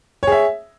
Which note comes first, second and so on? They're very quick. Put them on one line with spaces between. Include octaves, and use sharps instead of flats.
C#5 G#4 E5